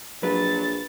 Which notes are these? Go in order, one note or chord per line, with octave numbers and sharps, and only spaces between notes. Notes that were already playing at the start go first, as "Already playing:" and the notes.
A#1 F#3 B4 A6